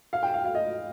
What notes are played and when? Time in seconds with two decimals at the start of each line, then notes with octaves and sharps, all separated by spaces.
0.13 F5
0.23 G5
0.34 F5
0.45 F5
0.55 D#5